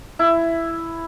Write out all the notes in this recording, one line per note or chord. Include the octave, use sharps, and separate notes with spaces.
E4